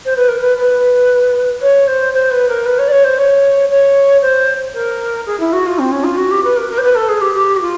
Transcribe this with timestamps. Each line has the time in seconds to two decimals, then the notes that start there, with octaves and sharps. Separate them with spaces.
0.05 C5
0.16 B4
0.28 A#4
0.40 B4
0.58 B4
1.62 C#5
1.87 C5
2.13 C5
2.31 B4
2.48 A#4
2.65 B4
2.78 C#5
2.88 D5
2.91 C#5
3.04 C5
3.18 C#5
3.70 C#5
4.21 C5
4.74 A#4
5.26 G#4
5.40 E4
5.52 F#4
5.66 F4
5.79 C4
5.91 C#4
6.04 F4
6.17 F#4
6.31 G4
6.44 B4
6.56 A#4
6.69 A#4
6.78 C5
6.83 B4
6.95 A4
7.08 G#4
7.21 G4
7.34 G4
7.56 F#4
7.61 F4